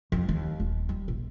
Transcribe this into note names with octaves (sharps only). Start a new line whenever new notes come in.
F2
D#2
D#1
G3
A#1